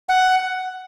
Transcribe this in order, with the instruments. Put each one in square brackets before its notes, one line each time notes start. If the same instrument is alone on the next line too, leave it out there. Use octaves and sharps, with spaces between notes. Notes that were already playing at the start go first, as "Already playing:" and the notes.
[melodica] F#5